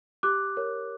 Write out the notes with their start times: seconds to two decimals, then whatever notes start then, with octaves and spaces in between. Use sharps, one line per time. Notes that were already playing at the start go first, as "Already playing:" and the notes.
0.23 G4 D6 F#6
0.57 A#4 C#5